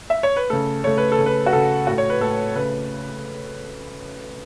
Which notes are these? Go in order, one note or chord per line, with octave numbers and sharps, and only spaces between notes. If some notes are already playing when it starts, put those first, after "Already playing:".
E5
C#5
B4
C#3 A3 A4
C#3 A3 C#5
B4
A4
C#3 A3
B4
F#4
C#3 A3 A4
A2 A3 F#4
C#5
B4
A2 A3 A4
C#3 A3 B4